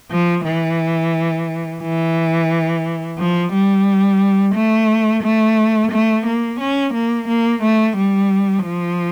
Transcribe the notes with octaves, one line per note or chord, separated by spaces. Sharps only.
F3
E3
E3
F3
G3
A3
A3
A3
A#3
C#4
A#3
A#3
A3
G3
F3